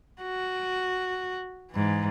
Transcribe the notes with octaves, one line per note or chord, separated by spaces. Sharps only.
F#4
G#2 E3